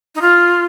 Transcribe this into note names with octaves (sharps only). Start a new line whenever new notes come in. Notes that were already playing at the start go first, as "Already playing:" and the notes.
D#4
F4